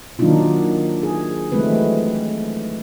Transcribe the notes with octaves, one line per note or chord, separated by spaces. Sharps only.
D#3 F#3 A#3 D4 D#4 F4
G#4
E3 F#3 G#3 A3 C4 B4